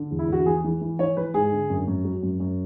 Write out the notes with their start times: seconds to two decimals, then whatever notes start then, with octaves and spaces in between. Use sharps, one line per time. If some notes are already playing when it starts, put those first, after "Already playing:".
Already playing: D3
0.11 E2
0.19 E4
0.29 E2 F#4
0.46 E3 G#4
0.64 E3
0.81 E3
0.99 E3 C#5
1.17 E3 B4
1.34 G#2 G#4
1.52 D3
1.70 F#2
1.87 F#2
2.05 F#3
2.23 F#2
2.40 F#2